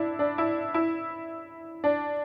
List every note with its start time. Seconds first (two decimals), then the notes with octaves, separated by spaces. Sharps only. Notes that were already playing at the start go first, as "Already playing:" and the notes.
Already playing: D4 E4
0.19 D4
0.38 E4
0.74 E4
1.84 D4